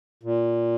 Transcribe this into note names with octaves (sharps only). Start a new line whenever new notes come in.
A#2